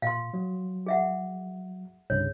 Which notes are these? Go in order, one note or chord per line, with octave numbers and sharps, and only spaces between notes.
A#2 F5 C6
F#3
G#4 E5 F#5
C2 G2 C#3 C#5